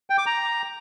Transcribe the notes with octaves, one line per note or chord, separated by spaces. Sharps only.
G5
D6
A#5